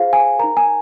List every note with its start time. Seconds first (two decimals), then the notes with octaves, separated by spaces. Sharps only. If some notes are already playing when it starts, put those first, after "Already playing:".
Already playing: F4 G#4 C5 F5
0.13 G#5
0.39 D#4 A#4 A#5
0.57 G#5